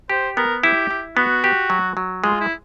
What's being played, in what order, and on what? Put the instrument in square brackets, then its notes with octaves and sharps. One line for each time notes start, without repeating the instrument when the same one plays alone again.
[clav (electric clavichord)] G4 [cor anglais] C5
[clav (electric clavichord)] B3 [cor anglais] A#4
[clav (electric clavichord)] E4 [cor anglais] G4
[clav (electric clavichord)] E4
[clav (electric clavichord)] B3 [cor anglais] F#4
[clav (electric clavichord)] G4
F#3
F#3
[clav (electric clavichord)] G#3 [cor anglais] F4
[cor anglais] E4